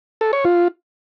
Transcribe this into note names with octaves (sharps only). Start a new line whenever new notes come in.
A4
C#5
F4